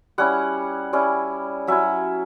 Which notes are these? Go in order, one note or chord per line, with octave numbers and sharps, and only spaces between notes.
G3 C#4 E4 F#5
G3 C#4 E4
F#3 C#4 E4 E5